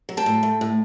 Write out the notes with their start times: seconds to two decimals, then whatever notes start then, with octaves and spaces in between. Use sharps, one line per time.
0.09 F#3
0.17 G5 A5
0.26 A2
0.43 A3
0.61 A2